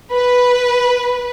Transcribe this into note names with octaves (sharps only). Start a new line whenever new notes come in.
B4